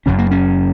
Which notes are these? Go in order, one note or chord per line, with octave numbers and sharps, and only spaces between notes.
F#1 F#2 C#3 C#4
A#3
C#4